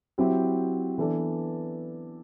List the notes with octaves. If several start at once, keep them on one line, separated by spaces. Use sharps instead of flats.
F#3 C4 E4 G4
E3 B3 D4 A4 D5